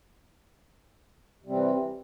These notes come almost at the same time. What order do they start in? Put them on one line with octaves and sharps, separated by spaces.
C3 G3 C4 E3